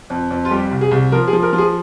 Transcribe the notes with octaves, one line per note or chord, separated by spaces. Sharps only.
F2
F2
F4
G3 G4
C2
G#4
C2
F3 A#4
G#4
F3
A#4
F3
G#4